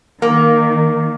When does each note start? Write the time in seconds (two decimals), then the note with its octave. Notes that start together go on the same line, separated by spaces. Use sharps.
0.22 D#3 A#3